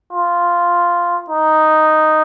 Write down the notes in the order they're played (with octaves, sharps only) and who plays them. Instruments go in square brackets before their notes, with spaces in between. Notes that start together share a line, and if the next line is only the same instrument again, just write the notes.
[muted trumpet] F4
D#4